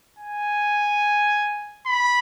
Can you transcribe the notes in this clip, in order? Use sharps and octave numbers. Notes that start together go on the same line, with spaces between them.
G#5
B5